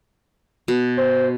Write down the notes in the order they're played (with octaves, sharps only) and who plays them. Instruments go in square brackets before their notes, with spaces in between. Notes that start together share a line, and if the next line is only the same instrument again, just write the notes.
[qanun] B2
[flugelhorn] C5